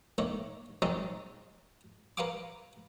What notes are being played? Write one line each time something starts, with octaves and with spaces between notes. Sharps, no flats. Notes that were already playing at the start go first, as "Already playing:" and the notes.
D#3 A3 A#3 D4 C#5
D#3 F3 F#3 G#3 C4 C#4
A#4 B4 F5 F#5 G#5 D6